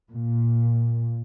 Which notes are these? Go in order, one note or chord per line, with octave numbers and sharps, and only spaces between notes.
A#2